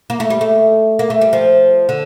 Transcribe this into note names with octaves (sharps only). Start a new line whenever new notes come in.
A#3
A3
G3
A3
A#3
A3
G3
F3
D3